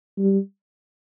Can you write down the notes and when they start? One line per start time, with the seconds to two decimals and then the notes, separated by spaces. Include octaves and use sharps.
0.18 G3